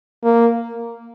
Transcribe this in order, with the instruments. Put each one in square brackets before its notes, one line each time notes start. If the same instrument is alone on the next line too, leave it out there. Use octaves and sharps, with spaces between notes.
[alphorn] A#3